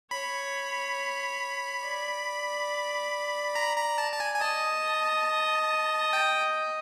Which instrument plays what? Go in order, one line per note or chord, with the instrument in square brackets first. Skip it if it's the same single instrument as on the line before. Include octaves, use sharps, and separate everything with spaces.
[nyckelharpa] C#5 [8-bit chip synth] B5
[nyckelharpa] D5
[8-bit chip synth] A#5
A#5
A5
A5
G#5
G#5
[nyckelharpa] D#5 [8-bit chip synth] A5
[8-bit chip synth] G5